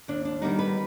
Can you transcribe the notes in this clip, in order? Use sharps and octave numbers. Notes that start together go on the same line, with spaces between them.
D#2 D4
D4
D#3 G3 B3 D#4
B4